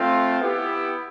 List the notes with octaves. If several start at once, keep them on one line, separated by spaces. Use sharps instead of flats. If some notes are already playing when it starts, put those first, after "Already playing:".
Already playing: A3 C4 F4
B3 E4 G4